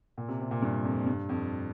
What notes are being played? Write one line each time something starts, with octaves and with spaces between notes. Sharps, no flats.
A#2
C3
C3
A#2
G2
F2
G2
F2